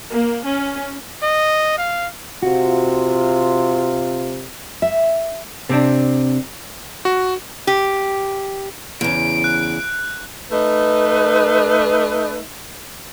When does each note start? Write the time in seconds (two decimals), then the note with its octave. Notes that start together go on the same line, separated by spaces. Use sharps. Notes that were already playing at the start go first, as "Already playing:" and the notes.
0.11 A#3
0.44 C#4
1.23 D#5
1.78 F5
2.43 C3 F4 F#4
4.82 E5
5.69 C3 C4 D4
7.05 F#4
7.67 G4
9.01 E2 C#3 D7
9.44 F#6
10.51 A3 D#4 B4